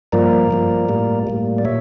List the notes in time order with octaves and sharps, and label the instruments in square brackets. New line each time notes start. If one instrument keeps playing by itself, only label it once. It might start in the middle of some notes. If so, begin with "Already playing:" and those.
[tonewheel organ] G2 F3 A#3 A#4 D5
G2 F3 A#3
A2 G3 A#3
A2 G3 A#3
D5
A#2 C#5 E5